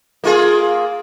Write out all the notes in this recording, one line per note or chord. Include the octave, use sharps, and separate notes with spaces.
A#3 F4 G#4